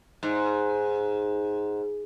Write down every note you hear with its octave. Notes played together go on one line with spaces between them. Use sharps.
G#2